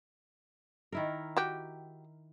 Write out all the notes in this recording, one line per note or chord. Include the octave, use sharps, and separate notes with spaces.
D#3 E4 A#4
F#4 G4